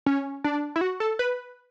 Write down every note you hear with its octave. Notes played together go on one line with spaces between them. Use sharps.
C#4
D4
E4
F#4
A4
B4